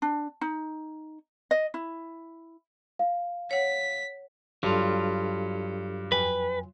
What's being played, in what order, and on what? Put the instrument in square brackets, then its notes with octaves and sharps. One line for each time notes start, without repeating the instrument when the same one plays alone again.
[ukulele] D4
D#4
D#5
E4
[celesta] F5
[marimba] C#5 F#5 [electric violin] B6
[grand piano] G2 [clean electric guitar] F#3 F4 [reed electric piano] D4 G4 A4
[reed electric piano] F2 G5 G#5 [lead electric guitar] B4